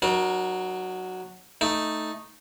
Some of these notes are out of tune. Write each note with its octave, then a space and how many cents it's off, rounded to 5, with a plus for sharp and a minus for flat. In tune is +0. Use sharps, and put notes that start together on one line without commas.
F#3 +0 D#4 -40 A#4 +30
A3 +0 D#4 +0